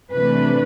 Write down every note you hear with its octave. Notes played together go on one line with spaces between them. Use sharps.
C3 E3 A3 D4 B4